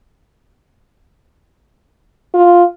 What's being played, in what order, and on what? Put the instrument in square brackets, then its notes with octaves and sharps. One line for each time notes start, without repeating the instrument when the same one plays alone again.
[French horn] F4